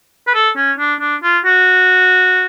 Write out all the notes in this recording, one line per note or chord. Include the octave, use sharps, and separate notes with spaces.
B4
A4
C#4
D4
D4
F4
F#4